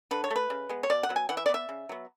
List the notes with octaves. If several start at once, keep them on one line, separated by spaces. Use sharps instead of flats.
D3 B4
C#5
A3
B4
C#3
G#3 B3
C#5
B2 D5
F#5
F#3 B3
G#5
E3 F#5
E5
D5
B3
E5
C#3
F#3 B3